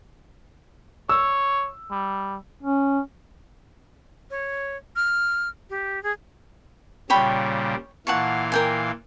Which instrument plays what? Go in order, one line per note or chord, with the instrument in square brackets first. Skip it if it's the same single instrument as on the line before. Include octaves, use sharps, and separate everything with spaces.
[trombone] C#5 [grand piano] E6
[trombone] G3
[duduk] C#4
[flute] C#5
F6
G4
G#4
[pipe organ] A#2 C#3 G3 [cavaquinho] C#5 G5 B5
[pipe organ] A#2 E3 F5 [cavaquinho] F#5 A5 C#6
[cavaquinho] A#4 G5 G#5